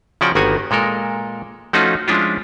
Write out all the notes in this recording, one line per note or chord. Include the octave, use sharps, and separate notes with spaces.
C#3 F3 C#4 F#4 D5 G5
G1 D#3 A#3 B3 F#4 G#5
A#2 G#3 A4 A#4
F3 A3 C#4 D#4 F4 F#4
F3 G#3 C#4 D4 E4 F4